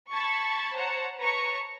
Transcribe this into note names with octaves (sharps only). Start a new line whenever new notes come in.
A5 B5 C#6 G#6 A6
C5 C#5 F#5 A5 A#5
B4 C#5 A5 A#5 C#6